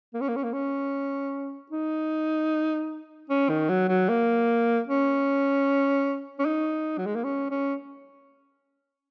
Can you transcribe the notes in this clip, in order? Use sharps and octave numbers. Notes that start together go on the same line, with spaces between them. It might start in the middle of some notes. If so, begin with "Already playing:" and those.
A#3
C#4
A#3
C#4
A#3
C#4
D#4
C#4
D#3
F#3
F#3
A#3
C#4
C#4
D#4
F#3
G#3
A#3
C#4
C#4